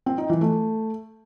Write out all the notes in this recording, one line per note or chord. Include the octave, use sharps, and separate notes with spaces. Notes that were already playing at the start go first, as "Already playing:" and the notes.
C4
D#4
E3
A3